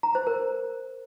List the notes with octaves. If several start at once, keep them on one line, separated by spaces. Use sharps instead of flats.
A#5
C5
A#4